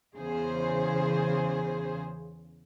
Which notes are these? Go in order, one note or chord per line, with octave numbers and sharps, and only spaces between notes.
E2 C#3 G#4 C5